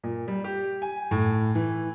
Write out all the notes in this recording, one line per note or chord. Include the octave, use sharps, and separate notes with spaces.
A#2
G3
G4
G#5
A2
E3